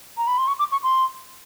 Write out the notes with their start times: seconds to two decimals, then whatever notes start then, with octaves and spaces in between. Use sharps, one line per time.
0.18 A#5
0.27 B5
0.38 C6
0.48 C#6
0.59 D6
0.72 C#6
0.83 C6